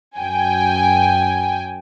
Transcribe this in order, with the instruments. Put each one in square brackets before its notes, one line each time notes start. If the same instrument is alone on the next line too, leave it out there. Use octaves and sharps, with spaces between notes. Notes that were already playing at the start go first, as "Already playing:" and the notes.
[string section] F#2 G5 G#5